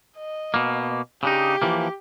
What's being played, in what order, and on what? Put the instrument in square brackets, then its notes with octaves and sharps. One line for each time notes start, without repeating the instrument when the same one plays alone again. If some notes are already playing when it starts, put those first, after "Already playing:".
[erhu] D#5
[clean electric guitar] B2 A#3
[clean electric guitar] C#3 D4 D#4 [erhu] G4
[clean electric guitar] E3 F3 A#3